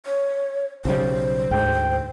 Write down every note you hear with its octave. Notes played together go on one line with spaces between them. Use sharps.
C#5
B1 C#3 G3 C5
D2 G#2 G5